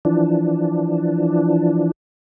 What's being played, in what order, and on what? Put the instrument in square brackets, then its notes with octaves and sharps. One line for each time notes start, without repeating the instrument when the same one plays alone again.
[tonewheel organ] E3 F3 D4